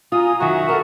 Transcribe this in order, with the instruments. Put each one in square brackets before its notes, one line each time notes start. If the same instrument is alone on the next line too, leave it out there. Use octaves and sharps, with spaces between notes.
[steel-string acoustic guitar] F4 [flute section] G#5 A#5 [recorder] D#6
[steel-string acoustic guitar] F#2 D#3 [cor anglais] F#4 [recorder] E5
[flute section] A4 [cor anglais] A#4 [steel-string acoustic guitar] F#5